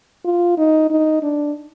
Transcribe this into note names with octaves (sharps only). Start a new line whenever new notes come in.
F4
D#4
D#4
D4